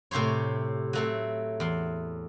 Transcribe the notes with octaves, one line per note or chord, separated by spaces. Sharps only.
A2 C3 G4 C5 C#5
F#3 A3 C4
E2 C6